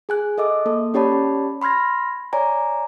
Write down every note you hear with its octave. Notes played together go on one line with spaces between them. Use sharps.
G#4 G#5 F#6
A4 D#5 E5 D6
A#3 A4
C#4 G4 C#5 D5 A5 B5
B5 C6 F6 G#6 A#6
C#5 D5 G#5 A#5